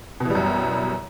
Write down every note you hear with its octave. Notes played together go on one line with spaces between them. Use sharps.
F#2 B2 E3 G3